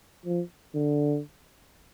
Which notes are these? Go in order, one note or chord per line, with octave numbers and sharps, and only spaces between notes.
F3
D3